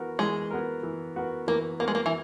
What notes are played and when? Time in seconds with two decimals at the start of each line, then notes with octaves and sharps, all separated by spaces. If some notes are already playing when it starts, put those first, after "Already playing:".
Already playing: E3 B3 F#4 A#4
0.19 E3 G#3
0.51 B3 F#4 A#4
0.83 E3
1.16 B3 F#4 A#4
1.48 E3 A#3
1.80 A#3 B3 F#4 A#4
1.88 G#3
1.95 A#3
2.06 E3